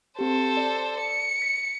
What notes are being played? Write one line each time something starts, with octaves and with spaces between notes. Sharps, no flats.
C4 G4 A4 C5
D5
C#7
B6